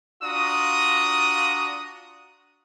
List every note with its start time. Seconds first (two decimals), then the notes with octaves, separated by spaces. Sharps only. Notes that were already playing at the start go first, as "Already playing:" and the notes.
0.23 D4 F4 F#4 A#5 D#6